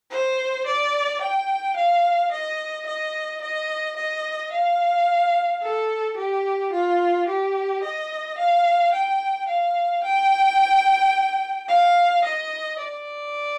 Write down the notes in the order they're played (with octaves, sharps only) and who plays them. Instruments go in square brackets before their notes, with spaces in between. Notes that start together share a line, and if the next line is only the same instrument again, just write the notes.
[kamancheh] C5
D5
G5
F5
D#5
D#5
D#5
D#5
F5
A4
G4
F4
G4
D#5
F5
G5
F5
G5
F5
D#5
D5